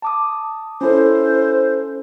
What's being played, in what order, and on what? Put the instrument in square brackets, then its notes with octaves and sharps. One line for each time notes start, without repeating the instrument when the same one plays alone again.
[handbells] A5 D6 D#6
[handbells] C#4 E4 A4 [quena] C5